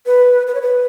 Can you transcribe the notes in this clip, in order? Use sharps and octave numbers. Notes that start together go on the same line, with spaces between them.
B4
B4
C#5
B4